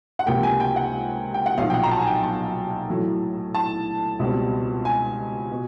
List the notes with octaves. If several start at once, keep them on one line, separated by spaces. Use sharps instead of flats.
F#5
C#2 C3 F3 A#3 G5
G#5
G5
F#5
G5
F#5
B1 A#2 F3 F5
G5
F#5
A#5
A5
G#5
G5
A5
A2 F#3 A3
A5
C#2 B2 G3 C4
G#5
B2